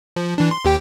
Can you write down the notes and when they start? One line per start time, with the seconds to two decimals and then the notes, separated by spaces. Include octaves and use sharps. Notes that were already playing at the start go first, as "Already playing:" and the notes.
0.16 F3
0.38 E3 D4
0.51 C6
0.65 D#2 G4 G5